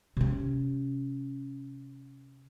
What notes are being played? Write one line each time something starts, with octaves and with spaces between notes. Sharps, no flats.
C3 C#4